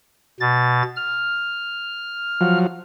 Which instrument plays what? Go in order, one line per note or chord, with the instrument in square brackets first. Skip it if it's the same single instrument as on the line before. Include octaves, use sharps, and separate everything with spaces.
[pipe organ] B2 A6
F6
[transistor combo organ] F3 F#3